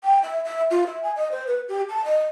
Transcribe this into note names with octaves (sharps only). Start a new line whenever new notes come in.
G5
E5
E5
F4
E5
G#5
D#5
C5
B4
G4
A5
D#5